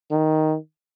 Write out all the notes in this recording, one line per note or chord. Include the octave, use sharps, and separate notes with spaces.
D#3